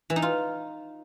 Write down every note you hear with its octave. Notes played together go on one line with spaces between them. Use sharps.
E3
D#4
F4